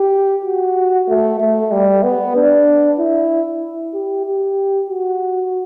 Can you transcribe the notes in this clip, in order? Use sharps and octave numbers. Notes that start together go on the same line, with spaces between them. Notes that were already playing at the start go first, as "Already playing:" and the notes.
Already playing: G4
F#4
A3
A3
G3
B3
D4
E4
G4
G4
F#4